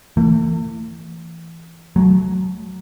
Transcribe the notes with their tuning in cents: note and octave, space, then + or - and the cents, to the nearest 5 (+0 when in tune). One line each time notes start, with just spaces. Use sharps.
E3 +15 A3 +45
F#3 +10 A3 -25